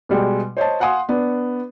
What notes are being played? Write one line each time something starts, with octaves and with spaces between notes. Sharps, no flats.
B2 G3 G#3
C5 C#5 D#5 A5
F5 F#5 G#5 C6 D#6
B3 D4